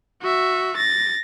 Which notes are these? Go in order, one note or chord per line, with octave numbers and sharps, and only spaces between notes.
F#4 E5
A6 A#6